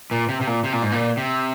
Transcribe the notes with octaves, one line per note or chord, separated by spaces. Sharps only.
A#2
C3
C3
A#2
C3
A#2
G#2
A#2
C3